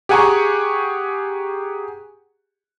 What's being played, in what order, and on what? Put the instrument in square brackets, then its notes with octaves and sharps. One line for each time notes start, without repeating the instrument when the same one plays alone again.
[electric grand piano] G4 G#4 F#5 G#5 A#5 C#6